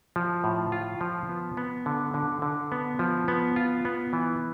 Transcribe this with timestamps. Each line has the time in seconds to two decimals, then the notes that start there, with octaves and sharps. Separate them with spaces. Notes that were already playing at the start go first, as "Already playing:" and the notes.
0.16 F3
0.44 A2
0.72 F4
1.01 F3
1.29 B3
1.57 B3
1.86 D3
2.14 D3
2.42 D3
2.72 B3
2.99 F3
3.28 B3
3.56 F4
3.85 B3
4.13 E3